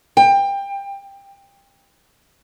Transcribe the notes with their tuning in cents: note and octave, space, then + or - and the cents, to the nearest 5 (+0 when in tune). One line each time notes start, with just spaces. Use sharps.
G5 +20